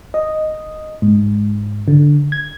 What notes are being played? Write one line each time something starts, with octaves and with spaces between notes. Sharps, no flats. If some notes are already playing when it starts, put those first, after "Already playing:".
D#5
G#2
D3
G#6